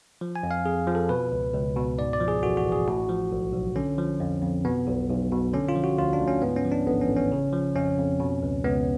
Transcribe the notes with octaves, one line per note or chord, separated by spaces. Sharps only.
F3
G#5
F2
F5
F2 G#4
F3
A4
B2 B4
C#2
C#2
B2
G#2 D5
D5
F3
G#4
A1 F#4
F#4
A1
G#4
A2 F#4
F3
B1
B1
D3 C#4
F3
F2
F2
B2 B3
B1
B1
B2
D3 C#4
F4
F3
F#4
D2 F4
D4
D2
C#4
G#2 B3
C#4
F3
D4
A1 B3
C#4
A1
C#4
C#3
F3
F2 C#4
F2
B2
C#2
C#2 B3